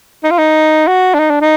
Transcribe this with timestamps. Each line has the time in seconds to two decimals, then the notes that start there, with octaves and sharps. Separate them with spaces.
0.24 D#4
0.31 F4
0.38 D#4
0.87 F#4
1.14 D4
1.19 D#4
1.30 D4
1.41 D#4